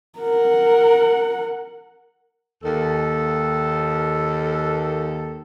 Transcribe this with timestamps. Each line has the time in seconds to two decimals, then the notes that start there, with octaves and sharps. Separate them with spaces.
0.19 A#4 F#5
2.63 D#2 A4